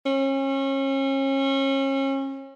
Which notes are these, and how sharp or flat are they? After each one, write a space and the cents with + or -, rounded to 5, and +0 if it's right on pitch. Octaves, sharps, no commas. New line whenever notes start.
C#4 -35